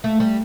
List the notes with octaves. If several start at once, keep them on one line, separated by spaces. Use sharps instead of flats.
A3
G3